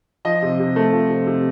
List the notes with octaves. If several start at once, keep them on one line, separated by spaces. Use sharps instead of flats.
F3 D#5
C3
C3
A3
F3
C3
C3